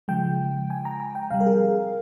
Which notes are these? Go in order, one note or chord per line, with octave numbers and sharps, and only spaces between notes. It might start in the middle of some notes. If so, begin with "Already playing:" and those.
C#3 F3 G#3 G5
G#5
A#5
A#5
G5
C3 G3 F5
A#4
G#4